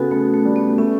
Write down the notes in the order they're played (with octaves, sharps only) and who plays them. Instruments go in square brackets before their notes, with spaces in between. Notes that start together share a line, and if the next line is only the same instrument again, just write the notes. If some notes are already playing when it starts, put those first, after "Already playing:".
Already playing: [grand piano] C#3 B3 [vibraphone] F#4 A4 B4
[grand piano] C#3 [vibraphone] A3
[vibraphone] A3
[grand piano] G3
[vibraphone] B3
[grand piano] A3 [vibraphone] C#4